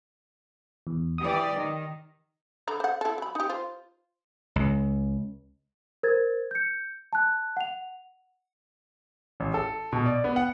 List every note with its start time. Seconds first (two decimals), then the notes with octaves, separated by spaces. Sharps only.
0.87 E2
1.18 E3 G4 D5 D#6
1.55 D#3
2.68 D3 A#5 B5
2.80 C5 F#5
3.01 E4 A4
3.18 F#3 B5
3.35 D#4 G4
3.49 F4 C5
4.56 C#2
6.03 A#4 C5 G#6 A6
6.51 G6 C#7
7.13 A5 F#6
7.57 F#5 F7
9.40 A1
9.54 A4
9.93 B2
10.06 D5
10.24 B3
10.36 F#5